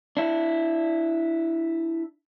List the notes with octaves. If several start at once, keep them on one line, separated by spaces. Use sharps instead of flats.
D4 E4